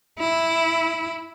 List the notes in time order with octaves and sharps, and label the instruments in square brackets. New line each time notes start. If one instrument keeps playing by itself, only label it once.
[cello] E4